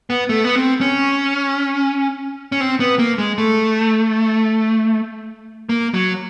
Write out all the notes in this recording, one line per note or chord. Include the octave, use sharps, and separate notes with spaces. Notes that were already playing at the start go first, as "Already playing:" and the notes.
B3
A3
B3
C4
C#4
C#4
C4
B3
A#3
G#3
A3
A#3
F#3